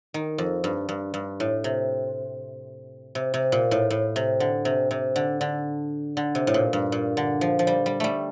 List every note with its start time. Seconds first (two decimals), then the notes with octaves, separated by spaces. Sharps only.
0.14 D#3
0.38 F2
0.64 G2
0.89 G2
1.14 G2
1.40 A2
1.64 C3
3.15 C3
3.34 C3
3.52 A#2
3.71 A2
3.90 A2
4.16 C3
4.40 D3
4.65 C3
4.91 C3
5.16 D3
5.41 D3
6.17 D3
6.35 C3
6.47 A2
6.54 A#2
6.73 G2
6.92 A#2
7.17 D3
7.41 F3
7.59 F3
7.67 G3
7.86 G3
8.00 G3 A3